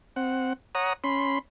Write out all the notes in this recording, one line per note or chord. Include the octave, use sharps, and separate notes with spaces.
C4 F#5
C#5 F#5 A#5 D#6
C#4 B5 C6